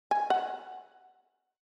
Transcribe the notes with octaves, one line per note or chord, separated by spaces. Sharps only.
G#5
F#5